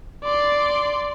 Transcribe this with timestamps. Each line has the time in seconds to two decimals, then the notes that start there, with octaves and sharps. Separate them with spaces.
0.24 D5 C6